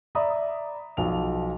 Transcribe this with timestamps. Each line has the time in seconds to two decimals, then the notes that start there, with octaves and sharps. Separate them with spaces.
0.15 D5 E5 A#5 B5 D#6
0.97 B1 F3 F7